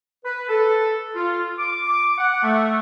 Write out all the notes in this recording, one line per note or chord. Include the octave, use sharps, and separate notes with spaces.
B4
A4
F4
D6
F#5
A3